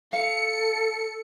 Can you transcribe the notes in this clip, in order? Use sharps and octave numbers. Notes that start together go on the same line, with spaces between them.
A4 F5 C#7